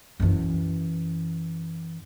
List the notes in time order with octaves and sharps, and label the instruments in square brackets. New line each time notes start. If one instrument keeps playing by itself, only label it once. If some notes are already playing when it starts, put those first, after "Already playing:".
[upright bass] F#2 E3